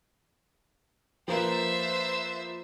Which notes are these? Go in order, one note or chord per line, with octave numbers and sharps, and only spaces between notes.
F3 A#3 B4 C5 E5